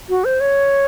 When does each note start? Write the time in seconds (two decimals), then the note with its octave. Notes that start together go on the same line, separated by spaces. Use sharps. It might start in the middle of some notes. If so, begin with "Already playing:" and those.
0.09 F#4
0.25 C5
0.40 C#5